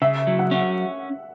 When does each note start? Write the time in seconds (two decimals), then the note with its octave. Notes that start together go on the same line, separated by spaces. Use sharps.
0.02 C#3 E5
0.27 F#3
0.39 F#5
0.51 C#4